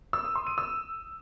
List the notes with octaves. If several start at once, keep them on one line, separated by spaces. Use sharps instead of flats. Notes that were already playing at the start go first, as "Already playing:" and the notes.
E6
D#6
C6
D#7
E6